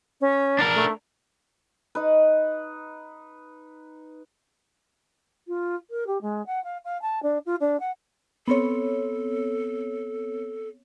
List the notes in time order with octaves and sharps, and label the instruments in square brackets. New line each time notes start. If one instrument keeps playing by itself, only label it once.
[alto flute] C#4
[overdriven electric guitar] D4 A#4
[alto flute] A3
[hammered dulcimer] D#4 B4
[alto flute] F4
A#4
G4
G#3
F#5
F5
F5
A5
D4
F4
D4
F#5
[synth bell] B3 C4 C#5 [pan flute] A4